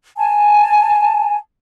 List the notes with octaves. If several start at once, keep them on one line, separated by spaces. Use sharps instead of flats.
G#5 A5